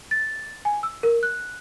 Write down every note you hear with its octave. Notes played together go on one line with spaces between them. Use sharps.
A6
G#5
E6
A#4
F#6